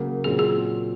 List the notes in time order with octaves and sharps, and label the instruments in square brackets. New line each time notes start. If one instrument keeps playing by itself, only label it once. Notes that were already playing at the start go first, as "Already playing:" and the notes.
Already playing: [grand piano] C#3 F#3 A#3
[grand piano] A#2 F#3 C4 [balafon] G#4
[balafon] G#4